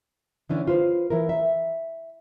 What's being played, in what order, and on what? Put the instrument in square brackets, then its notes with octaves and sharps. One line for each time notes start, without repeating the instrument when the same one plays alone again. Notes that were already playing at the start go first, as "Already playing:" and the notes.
[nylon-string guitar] D3 E3 C#4 D4
F4 B4 C5
E3 E4 A#4
E5